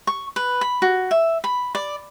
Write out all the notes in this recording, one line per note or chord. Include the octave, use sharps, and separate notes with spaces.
C#6
B4
B5
F#4
E5
B5
D5